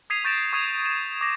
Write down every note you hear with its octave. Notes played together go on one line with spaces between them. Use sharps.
D#6 G#6 B6 C7 D#7 F7
C#6 G6 A6 A#6 D7 E7
C#6 D#6 G#6 C7 F7
E7
D6 A#6